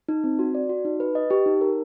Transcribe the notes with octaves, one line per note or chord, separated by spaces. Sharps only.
D#4
C4
F#4
D5
F#4
D#4
B4
D#5
G4
D#4
A#4